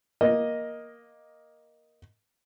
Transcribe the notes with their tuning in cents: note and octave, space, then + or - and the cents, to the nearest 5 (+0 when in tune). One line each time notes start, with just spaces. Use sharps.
A#3 +10 D#5 +0